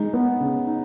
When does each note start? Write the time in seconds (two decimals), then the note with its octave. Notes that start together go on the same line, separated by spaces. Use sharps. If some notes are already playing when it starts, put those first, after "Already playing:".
Already playing: G#3 D#4
0.13 B3
0.40 C#3
0.67 D#4